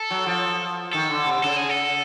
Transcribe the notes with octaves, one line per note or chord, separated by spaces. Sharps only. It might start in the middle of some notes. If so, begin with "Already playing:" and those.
Already playing: A4
F#3
F3
D#3 A4
D3
C3
C#3 A4
G#4
A4